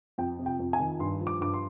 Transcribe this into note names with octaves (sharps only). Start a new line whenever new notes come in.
F2 G5
C3
G5
F2
G#5
D#3
G2 C6
F3
D6
G2 D6
C6